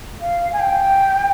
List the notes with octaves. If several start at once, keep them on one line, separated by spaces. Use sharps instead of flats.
F5
G#5
G5